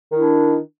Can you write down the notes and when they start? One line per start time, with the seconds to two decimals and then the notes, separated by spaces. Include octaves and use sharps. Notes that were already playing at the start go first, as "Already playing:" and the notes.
0.12 D#3
0.15 E4
0.17 D4